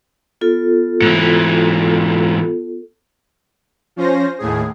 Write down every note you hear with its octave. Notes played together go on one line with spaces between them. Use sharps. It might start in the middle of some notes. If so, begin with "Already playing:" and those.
B3 F4 A4
G#2 E3
F3 C#4 C5 A#6
D#2 A2 G#4